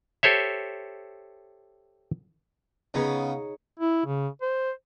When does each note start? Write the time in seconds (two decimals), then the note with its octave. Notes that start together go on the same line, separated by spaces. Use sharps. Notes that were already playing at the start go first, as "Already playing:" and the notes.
0.23 G4 A4 C5 C#5 E5
2.94 C#3 B3 D#4 G#4 C#5
3.80 E4
4.06 C#3
4.42 C5